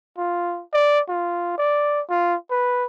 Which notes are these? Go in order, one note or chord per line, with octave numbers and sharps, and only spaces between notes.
F4
D5
F4
D5
F4
B4